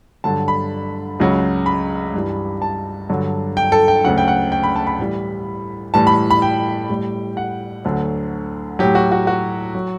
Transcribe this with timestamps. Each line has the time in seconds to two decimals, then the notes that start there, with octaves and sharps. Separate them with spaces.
0.24 G2 D3 F#3 A5
0.48 B5
1.20 C#2 C#3 F#3
1.66 B5
2.14 G2 E3 G3
2.62 A5
3.09 G2 D3 F#3
3.57 G5
3.72 A4
3.88 G5
4.04 D2 C#3 F#3 F#5
4.18 G5
4.28 F#5
4.52 G5
4.63 B5
4.76 A5
4.87 B5
4.99 A2 E3 G3
5.94 A2 E3 G3 A5
6.07 B5
6.31 B5
6.42 G5
6.90 A2 G3
7.37 F#5
7.85 D2 D3 F#3
8.79 A2 F#3 G4
8.95 F#4
9.12 F#4
9.27 F#4
9.75 F#3